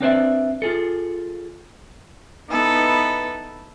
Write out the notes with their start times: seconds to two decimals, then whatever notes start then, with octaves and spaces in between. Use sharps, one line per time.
0.01 C4 D4 B4 C5 D5 E5
0.62 F4 G#4 A4
2.49 B3 D#4 E4 A4 B4